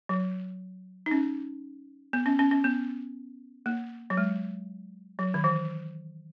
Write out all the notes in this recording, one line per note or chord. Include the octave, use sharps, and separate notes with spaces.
F#3
D#4
C#4
B3
C#4
C#4
C#4
B3
A#3
F#3
G#3
F#3
D#3
E3